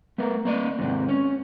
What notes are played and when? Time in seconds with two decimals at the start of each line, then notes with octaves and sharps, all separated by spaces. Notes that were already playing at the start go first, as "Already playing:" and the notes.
0.18 A3 B3 A#4
0.45 A#3 D5 D#5
0.79 D#2 G#2 C3
1.09 C#4